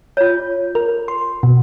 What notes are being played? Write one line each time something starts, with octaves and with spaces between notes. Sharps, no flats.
F4 C#5
A#4
C6
B2